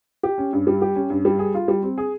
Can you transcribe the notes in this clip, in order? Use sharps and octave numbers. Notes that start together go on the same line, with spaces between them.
G4
C#4
G2
G3
G4
C#4
G2
G3
G#4
F4
G3
C4
G#4